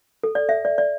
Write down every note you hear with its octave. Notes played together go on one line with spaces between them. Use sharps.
A4
D5
E5
D5
D5